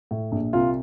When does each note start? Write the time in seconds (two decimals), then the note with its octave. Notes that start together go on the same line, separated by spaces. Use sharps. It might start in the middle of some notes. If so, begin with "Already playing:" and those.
0.11 A2
0.32 A#1
0.53 C2 F4